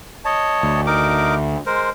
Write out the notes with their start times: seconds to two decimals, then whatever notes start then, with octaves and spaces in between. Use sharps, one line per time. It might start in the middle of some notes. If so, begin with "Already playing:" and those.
0.25 C#5 D#5 A5
0.63 D2
0.86 D#4 A#4 D6
1.66 G#3 A#4 C5